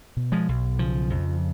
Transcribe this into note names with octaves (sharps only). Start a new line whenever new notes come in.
B2
F3 G#3
B1
C#3 F3
F2